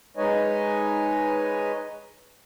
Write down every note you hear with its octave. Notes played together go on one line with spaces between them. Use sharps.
G#3 D#4 B4 C#5 D#5 G#5